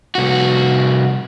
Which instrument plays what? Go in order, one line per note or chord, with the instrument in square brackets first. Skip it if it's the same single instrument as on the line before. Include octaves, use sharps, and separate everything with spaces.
[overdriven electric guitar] C2 F#4